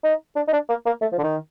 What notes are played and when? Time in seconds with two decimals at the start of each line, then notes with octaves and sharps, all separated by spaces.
0.04 D#4
0.36 D4
0.48 D#4
0.53 D4
0.69 A#3
0.86 A#3
1.02 A3
1.12 F3
1.18 D3
1.23 D#3